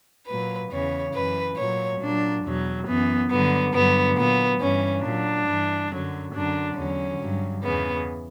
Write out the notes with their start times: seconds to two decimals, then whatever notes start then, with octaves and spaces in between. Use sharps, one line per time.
0.28 A#2 F#3 B4
0.71 E2 C#3 E3 C#5
1.14 F#2 E3 B4
1.57 A#2 F#3 C#5
2.00 A#2 F#3 D4
2.45 E2 B2 F#3
2.87 F#2 E3 B3
3.31 G2 D3 F#3 B3
3.74 G2 D3 F#3 B3
4.17 A#2 F#3 B3
4.60 G2 E3 C#4
5.04 A#2 F#3 D4
5.47 G2 E3
5.91 F#2 D3 F#3
6.34 F#2 D3 F#3 D4
6.77 E2 D3 F#3 C#4
7.20 G2 F#3
7.63 E2 C#3 E3 B3